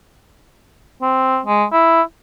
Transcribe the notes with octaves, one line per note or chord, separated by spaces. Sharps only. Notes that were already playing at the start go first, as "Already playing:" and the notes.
C4
G#3
E4